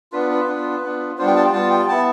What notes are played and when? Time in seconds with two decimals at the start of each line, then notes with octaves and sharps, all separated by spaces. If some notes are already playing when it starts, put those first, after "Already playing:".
0.12 B3 D4 F4 B4
0.31 B4
0.47 B3 D4 F4
0.84 B3 D4 F4
1.18 G3 B3 D4 F4 C5
1.27 G5
1.36 A5
1.45 G5
1.53 G3 B3 F4 A5
1.70 G5
1.88 B3 E4 A5